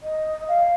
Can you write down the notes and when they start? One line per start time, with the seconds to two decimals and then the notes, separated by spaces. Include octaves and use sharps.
0.03 D#5
0.48 F5